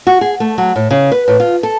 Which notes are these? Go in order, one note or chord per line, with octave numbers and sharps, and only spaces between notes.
F#4
G#4
A3
F#3
A2
C#3
B4
A2
F4
A4